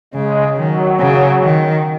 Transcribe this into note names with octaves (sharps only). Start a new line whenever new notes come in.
C#3 G#3
D#3 F#3
C#3
D#3